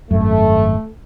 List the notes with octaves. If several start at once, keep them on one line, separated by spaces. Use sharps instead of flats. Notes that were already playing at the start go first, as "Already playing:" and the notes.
G#1 F#2 A3